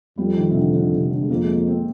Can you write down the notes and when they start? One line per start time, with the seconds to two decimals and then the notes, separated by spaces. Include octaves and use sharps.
0.18 F2 G3
0.36 D#3
0.50 C3
0.55 D3
0.74 D3
0.92 C3
1.11 D3
1.22 G#3
1.29 F2 A#3
1.43 G#3
1.48 A#3
1.67 C4